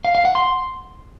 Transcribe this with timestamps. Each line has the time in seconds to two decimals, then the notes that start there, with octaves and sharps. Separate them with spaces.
0.05 F5
0.15 F5
0.25 F#5
0.35 C6